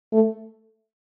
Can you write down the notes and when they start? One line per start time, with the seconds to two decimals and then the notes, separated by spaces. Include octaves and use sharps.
0.13 A3